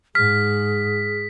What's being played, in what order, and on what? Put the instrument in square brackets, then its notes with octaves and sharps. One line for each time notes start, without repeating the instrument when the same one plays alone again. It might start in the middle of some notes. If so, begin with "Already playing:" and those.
[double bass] G#2 [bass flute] G#4 [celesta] F6 [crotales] B6